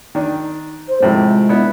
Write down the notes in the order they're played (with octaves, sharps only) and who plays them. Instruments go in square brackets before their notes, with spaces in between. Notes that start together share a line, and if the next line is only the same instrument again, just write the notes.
[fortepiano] D#3 D4
[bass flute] C5
[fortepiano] A2 C3 F3 [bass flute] G#3
[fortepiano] B3 D4 E4